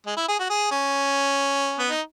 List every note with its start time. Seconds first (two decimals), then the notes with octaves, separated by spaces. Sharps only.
0.06 G#3
0.17 E4
0.28 G#4
0.39 F#4
0.49 G#4
0.71 C#4
1.79 B3
1.90 D#4